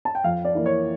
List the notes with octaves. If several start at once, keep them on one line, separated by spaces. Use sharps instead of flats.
A5
G5
F2 F5
D5
E3 A#3
C#5